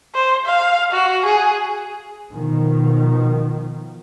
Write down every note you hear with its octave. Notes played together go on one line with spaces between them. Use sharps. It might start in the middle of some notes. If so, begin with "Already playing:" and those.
C5
F5
F#4
G#4
B2 D#3 F3